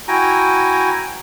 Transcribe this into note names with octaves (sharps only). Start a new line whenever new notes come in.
E4 F#4 G5 G#5 A#5